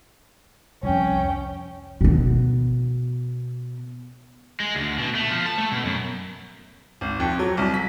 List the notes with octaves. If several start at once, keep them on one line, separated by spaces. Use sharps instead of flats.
C2 F2 C#4 G5
B2 B3
G#3
D2
B2
A3
F3
A5
A3
B2
F#2
G#1
F2
F#3
C2
B6